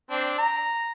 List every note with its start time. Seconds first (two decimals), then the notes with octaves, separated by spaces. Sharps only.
0.11 C4 D4
0.38 A#5